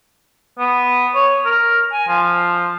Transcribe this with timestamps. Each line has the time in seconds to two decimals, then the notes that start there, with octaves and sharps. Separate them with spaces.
0.59 B3
1.14 C#5
1.45 A#4
1.92 G#5
2.08 F3